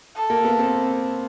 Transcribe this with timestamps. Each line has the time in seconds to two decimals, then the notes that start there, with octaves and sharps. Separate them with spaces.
0.15 A4
0.30 A#3
0.45 B3
0.59 C4